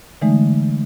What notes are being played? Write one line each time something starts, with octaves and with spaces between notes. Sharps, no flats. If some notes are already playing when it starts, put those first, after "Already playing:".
D3 E3 G#3 A3 D#4